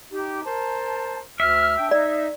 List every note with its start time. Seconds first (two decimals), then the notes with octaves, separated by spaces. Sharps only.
0.12 D#4 G4
0.45 A#4 C5 A5
1.40 D2 E5 F6
1.78 D4 G5
1.91 D#4 D5